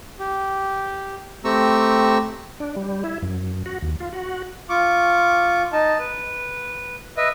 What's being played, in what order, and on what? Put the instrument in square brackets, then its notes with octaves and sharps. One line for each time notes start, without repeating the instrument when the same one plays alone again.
[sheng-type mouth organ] G4
A3 C4 G4 A#5 C#6 E6
[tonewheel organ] D4
G3
E4
F#2
F#4
D#2
F4
F#4
[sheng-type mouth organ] F4 C#6 D6
D#4 A5
B4
B4 D#5 E5